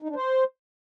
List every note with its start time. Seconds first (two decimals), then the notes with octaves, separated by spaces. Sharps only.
0.02 D#4
0.09 D4
0.16 C5